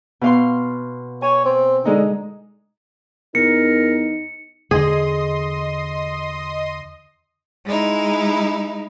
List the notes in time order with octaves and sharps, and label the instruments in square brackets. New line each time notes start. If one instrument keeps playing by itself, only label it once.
[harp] B2 F5 C6
[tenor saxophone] C#5 [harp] G#5
[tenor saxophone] C4
[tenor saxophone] D3 [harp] G#3 D#4
[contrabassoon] E2 [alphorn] D#4 [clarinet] A#4 [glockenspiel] C#7
[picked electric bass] E2 D3 [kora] G#4 [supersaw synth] D#5 C6 D#6
[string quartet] G#3 D#4 E4